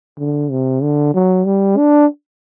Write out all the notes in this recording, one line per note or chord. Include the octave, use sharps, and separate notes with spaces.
D3
C3
D3
F#3
G3
D4